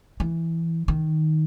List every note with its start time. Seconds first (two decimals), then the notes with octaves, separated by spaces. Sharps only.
0.20 E3
0.88 D#3